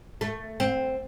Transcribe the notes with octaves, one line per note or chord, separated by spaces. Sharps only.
A3
C4